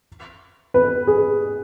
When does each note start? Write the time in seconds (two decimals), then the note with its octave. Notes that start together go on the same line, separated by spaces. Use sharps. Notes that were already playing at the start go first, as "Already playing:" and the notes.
0.74 B4
1.07 G#4